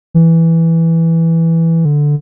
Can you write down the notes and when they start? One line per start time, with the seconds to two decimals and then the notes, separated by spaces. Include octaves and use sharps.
0.14 E3
1.85 D3